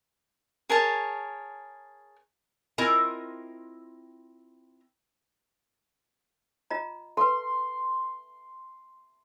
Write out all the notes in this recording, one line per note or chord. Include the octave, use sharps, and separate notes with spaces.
G#4 A#4 C#5 A5
C4 E4 F4 A#4 D#5 G#5
F4 D#5 A#5
A4 B4 C6